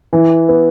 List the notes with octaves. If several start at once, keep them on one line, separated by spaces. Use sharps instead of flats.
E3
B3